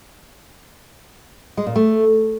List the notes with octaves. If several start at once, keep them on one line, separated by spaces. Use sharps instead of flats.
G#3
A#2
A3